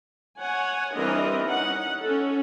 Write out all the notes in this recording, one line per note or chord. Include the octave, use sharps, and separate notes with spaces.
C#5 F#5 G#5
E3 G3 C4 D4 A#4 D#5
C#4 D#4 F#5
C#4 A4